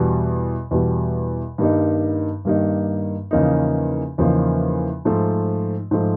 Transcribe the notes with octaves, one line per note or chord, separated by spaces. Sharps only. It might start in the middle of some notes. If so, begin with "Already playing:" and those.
Already playing: E2 B2 G3
E2 B2 G3
G2 D#3 G3 A#3 D#4
G2 D#3 G3 A#3 D#4
E2 C#3 F3 A#3 D#4
E2 C#3 F3 A#3 D#4
G#2 F3 A3
G#2 F3 A3